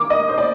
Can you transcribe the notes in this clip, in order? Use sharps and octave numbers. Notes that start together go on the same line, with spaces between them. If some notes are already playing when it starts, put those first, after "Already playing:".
Already playing: G2 D#3 A#3 D6
D#5
C5
D5